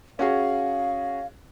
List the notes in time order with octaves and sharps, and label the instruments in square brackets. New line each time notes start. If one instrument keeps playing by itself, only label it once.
[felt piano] C#4 F#4 G#4 [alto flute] F5